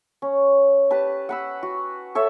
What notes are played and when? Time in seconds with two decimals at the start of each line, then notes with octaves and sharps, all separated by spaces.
0.22 C#4
0.91 G4 B4 A5
1.29 F#5 B5 E6
1.63 F#4
2.15 A4 C#5 E5